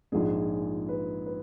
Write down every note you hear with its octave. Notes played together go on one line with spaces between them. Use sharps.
A#1 G#2 F3 G#3 G#4
B4
B4